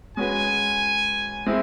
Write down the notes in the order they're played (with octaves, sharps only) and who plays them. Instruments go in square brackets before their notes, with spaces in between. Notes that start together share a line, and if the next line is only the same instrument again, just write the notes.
[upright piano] G#3 C#4 F#4 B4 [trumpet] G#5
[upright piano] G#3 C4 E4